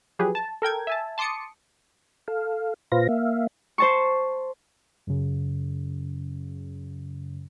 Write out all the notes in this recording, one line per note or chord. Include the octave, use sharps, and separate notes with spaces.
F3 F#3 G4 G#4 B4
A5
A4 A#4 G5 G#6
E5 G#5 A5
A5 C6 D6 D#6 C#7
A4 F5
A#2 F4 B4 C5 F5 A#6
A#3 E5 F5
C5 A5 C#6
F#2 C#3